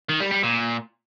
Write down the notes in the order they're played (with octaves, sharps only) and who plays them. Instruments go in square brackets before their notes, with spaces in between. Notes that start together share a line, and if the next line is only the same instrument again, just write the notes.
[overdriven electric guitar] D#3
G3
G3
A#2